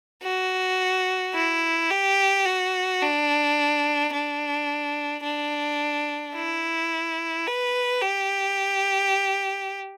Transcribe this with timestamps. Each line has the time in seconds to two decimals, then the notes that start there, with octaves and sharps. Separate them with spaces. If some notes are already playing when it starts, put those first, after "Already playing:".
0.23 F#4
1.34 E4
1.90 G4
2.46 F#4
3.02 D4
4.13 D4
5.23 D4
6.35 E4
7.47 B4
8.02 G4